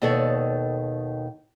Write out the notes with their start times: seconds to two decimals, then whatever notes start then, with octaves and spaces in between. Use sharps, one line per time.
0.02 D#2 B2 D#3 A4 C#5 D5